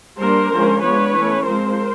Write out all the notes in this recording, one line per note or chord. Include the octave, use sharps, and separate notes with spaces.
G3 A#3 D4 A#4 C5
D3 F3 G#3 C#4
F3 G#3 B3 D4 B4 C#5
E3 A3 C#4
F3 G#3 C4 A#4 C5